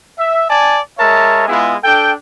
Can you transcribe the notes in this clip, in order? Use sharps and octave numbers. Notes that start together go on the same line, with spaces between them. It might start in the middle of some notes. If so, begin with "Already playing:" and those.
E5
D5 G#5 A5
G#3 A#4 C#5 E5 A5
G#3 B3 E4 F4 G#4
D4 A4 G5